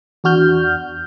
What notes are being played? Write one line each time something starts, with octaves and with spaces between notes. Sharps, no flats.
E2 D4 F#4 F6 G6